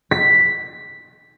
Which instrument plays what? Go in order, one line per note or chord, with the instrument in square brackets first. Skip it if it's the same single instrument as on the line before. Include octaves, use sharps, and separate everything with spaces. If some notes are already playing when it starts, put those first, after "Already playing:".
[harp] B6